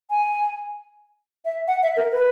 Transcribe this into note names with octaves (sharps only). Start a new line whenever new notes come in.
G#5
E5
F#5
E5
A#4
B4